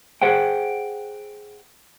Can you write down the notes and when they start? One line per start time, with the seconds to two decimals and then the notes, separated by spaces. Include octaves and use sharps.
0.22 G#4 C5 F#5 G5